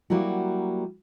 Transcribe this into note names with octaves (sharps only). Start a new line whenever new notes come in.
F#3 G3 A#3 E4 F#4